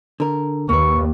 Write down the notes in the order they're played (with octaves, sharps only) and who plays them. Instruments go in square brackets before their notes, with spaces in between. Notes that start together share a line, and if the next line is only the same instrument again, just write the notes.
[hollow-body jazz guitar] D3 A#4
[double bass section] D#2 [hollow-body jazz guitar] A#3 B4 [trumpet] C#6